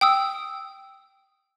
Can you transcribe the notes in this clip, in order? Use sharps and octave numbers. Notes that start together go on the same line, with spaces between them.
G5 D#6 E6